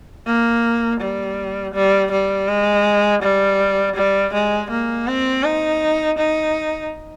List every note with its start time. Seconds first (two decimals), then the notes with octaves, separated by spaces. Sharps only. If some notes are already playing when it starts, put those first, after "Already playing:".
0.27 A#3
1.00 G3
1.74 G3
2.12 G3
2.48 G#3
3.22 G3
3.96 G3
4.34 G#3
4.71 A#3
5.07 C4
5.44 D#4
6.18 D#4